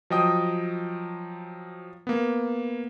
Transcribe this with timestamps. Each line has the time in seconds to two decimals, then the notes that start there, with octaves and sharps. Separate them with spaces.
0.10 F3 F#3 D#5 G5 D#6
2.07 A#3 B3